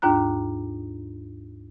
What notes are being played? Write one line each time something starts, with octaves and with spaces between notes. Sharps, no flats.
D#2 G#2 D4 F4 A#5 F#6